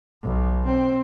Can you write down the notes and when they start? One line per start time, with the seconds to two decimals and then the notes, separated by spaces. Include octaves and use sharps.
0.23 B1
0.66 C4